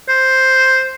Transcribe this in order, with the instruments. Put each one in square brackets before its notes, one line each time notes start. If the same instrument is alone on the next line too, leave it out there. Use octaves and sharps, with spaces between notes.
[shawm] C5